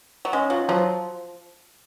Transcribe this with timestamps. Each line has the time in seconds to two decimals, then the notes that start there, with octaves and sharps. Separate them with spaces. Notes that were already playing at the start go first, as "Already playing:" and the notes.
0.25 F#3
0.33 G#3 C#4
0.50 F#3 F4
0.68 F3 F#3